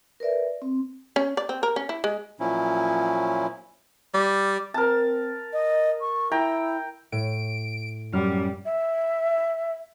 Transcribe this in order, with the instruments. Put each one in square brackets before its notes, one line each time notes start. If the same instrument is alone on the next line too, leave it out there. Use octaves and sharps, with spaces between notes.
[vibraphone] A#4 B4 D5 E5
C4
[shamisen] C#4
D5
C4
A#4
C#4
E4
G#3
[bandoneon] A#2 F3 F#3 C#4 E4
[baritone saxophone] G3
[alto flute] C4 [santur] A#4 A5
[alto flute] D#5
C#6
[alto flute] E4 [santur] G5 A#5
[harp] A2 [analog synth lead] D7
[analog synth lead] F#2 [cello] G3 [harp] F6
[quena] E5